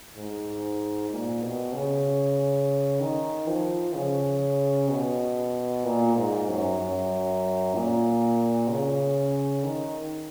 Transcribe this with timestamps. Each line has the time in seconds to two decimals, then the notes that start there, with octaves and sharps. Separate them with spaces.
0.16 G#2
1.10 A#2
1.42 B2
1.73 C#3
3.00 D#3
3.47 F3
3.95 C#3
4.89 B2
5.85 A#2
6.17 G#2
6.48 F#2
6.80 F#2
7.74 A#2
8.69 C#3
9.64 D#3